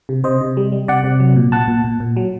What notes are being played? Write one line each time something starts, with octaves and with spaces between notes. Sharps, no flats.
C3
C3 C5 D#5
C3
G3
G3
C3 D5 F#5
C3
F#3
A#2
A#2 F#5 A5
A#2
A#2
A#2
F#3